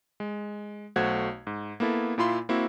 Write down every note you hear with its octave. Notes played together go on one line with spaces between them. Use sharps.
G#3
B1 A3 F#4 C5 F#5 G#6
G#2
A#3 B3 E4 A4
A#2 E4 F4 B5 C6
A#3 C4 E4 F#4